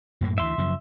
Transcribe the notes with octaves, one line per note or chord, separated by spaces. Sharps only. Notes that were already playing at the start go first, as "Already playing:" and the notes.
F#2 A2 A#3
D2 E3 E5 C6
F#2 C#3 F3